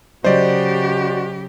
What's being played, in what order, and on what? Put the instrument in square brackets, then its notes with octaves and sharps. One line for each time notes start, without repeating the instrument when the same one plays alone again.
[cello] C#3 G4 [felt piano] F#3 D#5 [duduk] F#4 [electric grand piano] C5 D5